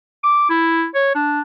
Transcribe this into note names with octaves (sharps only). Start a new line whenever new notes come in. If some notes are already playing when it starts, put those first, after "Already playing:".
D6
E4
C#5
D4